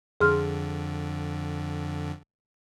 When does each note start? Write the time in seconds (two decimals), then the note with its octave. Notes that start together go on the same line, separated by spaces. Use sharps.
0.21 F2 D3 G#4 C6 F6